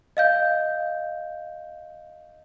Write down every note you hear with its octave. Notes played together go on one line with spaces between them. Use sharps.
D#5 F5 G6